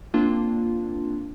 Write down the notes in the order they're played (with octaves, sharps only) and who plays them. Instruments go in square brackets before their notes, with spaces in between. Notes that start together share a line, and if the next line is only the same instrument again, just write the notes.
[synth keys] A#3 C4 D4 F4